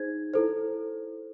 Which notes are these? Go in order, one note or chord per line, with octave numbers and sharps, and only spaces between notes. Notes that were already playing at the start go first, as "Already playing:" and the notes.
Already playing: D#4 G#4 C5 G#6
E4 A4 C5